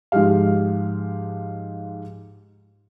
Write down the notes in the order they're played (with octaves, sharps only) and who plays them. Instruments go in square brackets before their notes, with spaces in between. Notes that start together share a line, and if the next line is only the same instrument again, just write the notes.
[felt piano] G#2 F3 G#3 G4 F5